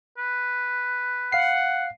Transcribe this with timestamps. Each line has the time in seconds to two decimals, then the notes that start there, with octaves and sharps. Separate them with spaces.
0.18 B4
1.32 F5 F#5 C7